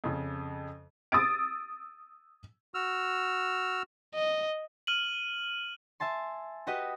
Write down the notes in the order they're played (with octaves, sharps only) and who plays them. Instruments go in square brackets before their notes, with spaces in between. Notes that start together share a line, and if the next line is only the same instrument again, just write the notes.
[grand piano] F2 C#3
[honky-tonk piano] D#6 E6 A6 D7
[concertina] F#4 E6 F6
[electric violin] D#5
[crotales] F6 D#7 F#7
[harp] E5 G#5 A5 C6
F#4 G4 B4 D#5